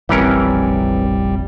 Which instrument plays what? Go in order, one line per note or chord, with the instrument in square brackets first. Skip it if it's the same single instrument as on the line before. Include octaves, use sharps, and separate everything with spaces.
[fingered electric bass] F1 A#1 C4 [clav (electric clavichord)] E3 C#4 A#4 [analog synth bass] G3